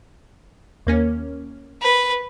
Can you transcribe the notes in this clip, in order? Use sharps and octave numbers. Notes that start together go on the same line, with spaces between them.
D#2 A#3 C#4
B4